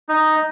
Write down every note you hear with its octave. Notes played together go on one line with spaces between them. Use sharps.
D#4